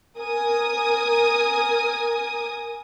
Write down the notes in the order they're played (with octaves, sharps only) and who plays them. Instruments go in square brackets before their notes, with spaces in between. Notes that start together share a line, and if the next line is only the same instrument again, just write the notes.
[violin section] A#4 G#5 D#6